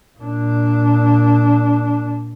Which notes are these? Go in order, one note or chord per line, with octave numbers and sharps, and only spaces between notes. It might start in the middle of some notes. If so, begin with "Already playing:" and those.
A#2 D4